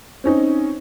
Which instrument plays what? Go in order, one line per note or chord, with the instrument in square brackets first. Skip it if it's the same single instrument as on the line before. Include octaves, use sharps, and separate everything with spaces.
[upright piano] C4 C#4 D#4